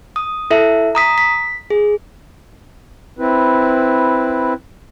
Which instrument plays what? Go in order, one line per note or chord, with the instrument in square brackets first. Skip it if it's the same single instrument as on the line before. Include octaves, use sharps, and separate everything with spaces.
[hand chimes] D#6
E4 A4 E5
A#5 D#6 B6
B6
G#4
[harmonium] C4 E4 B4